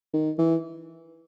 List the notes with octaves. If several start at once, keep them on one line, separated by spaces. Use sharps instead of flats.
D#3
E3